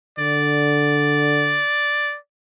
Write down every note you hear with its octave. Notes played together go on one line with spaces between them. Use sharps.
D3 D5